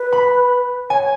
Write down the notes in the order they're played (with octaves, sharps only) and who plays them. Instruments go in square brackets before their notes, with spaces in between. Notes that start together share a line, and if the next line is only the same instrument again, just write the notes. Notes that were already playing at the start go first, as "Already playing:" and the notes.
Already playing: [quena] B4
[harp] B5
[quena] C#5 [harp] G#5